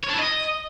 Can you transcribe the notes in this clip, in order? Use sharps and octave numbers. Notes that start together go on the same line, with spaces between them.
C#5
D4
E4
D#5